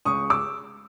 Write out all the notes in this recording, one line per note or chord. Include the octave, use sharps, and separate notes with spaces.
C#2 C#6 D#6
D6 E6